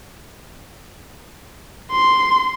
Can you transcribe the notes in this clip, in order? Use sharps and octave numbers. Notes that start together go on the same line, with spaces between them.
C6